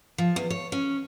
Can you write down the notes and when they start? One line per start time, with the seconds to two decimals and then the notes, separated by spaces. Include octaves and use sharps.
0.18 F3
0.36 E2
0.50 C#5
0.72 C#4